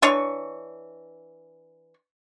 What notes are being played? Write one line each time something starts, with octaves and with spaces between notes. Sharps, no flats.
E3 D4 C#5 C#6